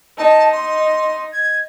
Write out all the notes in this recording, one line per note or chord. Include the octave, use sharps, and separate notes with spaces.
D#4 A5
C6
G#6